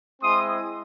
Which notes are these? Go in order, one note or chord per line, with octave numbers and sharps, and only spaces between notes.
G#3 C4 E4 C6 D#6